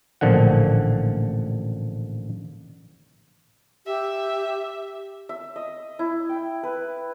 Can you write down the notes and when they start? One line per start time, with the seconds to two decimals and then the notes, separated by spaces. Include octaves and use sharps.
0.21 A1 A#2 D3 F3 F#5
3.86 G4 E5
5.29 E5
5.56 D#5
5.99 E4
6.29 G5
6.63 B4